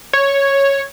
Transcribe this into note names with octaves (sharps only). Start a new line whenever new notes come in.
C#5